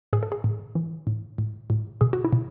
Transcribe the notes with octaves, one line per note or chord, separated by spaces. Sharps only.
A2 G#4
A4
G#4
A2
E3
A2
A2
A2
B2 G#4
F#4
E4
B2